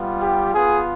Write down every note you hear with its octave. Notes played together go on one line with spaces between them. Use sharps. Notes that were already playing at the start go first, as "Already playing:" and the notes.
Already playing: G3 B3 F4
G4
B3 F4 G#4